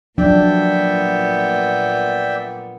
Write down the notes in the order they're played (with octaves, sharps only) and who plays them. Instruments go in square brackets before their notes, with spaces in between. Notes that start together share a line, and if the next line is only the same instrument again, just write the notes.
[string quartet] A#2 B3 [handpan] F3 F#3 D4 [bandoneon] D5 E5 G5